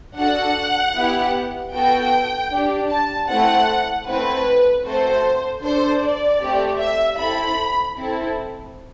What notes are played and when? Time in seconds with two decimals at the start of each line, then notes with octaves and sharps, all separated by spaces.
0.17 D4 F#4 A4 F#5
0.95 B3 E4 G4
1.73 B3 F#4 A4 G5
2.51 D4 G4
2.89 A5
3.28 A3 C4 E4 A4 F#5
4.06 A3 C4 E4 B4
4.85 A3 C4 F#4 A4 C5
5.62 D4 A4 C5
6.02 D5
6.40 A3 C4 G4
6.80 E5
7.18 C4 E4 A4 B5
7.97 C4 E4 A4